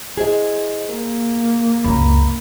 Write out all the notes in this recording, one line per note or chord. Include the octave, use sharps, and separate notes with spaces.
E4 G#4 C5 D#5
A#3 A#4
C#2 F#2 A#5 B5